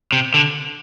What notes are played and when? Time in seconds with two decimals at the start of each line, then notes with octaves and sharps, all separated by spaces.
0.13 C3
0.34 D3